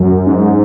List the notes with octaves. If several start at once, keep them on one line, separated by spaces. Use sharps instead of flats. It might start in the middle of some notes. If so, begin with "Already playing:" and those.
Already playing: F#2
G#2